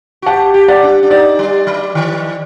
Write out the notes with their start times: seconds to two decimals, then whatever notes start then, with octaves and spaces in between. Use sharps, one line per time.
0.22 F#4
0.26 G4 F#5 A5
0.54 G4
0.68 D5 F#5
0.83 D4
1.03 D4
1.10 D#4 D5
1.39 G3
1.67 F#3
1.95 D#3